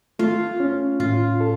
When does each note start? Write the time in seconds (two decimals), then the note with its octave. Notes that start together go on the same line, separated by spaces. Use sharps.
0.19 A3 F4
0.60 C#4
1.00 A2 F4
1.40 A4